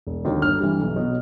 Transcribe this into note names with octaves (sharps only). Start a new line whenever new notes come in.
E1
D#2 D3 F#3
G1 F6
G2 E3 G3
B1
B2 F#3